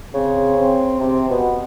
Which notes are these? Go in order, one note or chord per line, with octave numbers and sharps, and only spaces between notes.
C#3 C4
C4
C3 C4
B2 B3